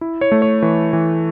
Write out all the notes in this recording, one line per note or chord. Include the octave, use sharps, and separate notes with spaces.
E4
C#5
A3
C#5
E3
E3